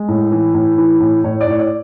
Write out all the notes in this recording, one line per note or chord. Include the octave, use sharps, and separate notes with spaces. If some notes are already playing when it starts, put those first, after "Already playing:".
Already playing: G#3
A2
E3
A2
E3
A2
A2 C#5
D5
A2 C#5
D5